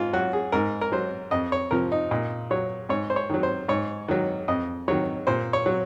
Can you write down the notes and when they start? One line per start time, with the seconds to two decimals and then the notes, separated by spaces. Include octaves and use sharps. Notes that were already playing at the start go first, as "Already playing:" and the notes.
Already playing: G#2 F4
0.13 F#3 F#4
0.33 G#4
0.52 G#2 A#4
0.81 A#4
0.92 F#3 C5
1.31 F2 D#5
1.52 C#5
1.71 C3 F3 A#4
1.92 D#4
2.11 A#2 D#4
2.51 F#3 C#5
2.89 G#2 C#5
3.10 C5
3.16 C#5
3.30 D#3 F#3
3.43 C5
3.68 G#2 C#5
4.08 D#3 F#3
4.48 F2 D#5
4.88 D#3 F#3 C#5
5.27 A#2 C5
5.53 C#5
5.66 F#3